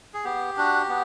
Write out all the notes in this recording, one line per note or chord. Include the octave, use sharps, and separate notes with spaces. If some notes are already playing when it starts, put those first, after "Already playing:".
G#4
B3 G4
D4 F#4
B3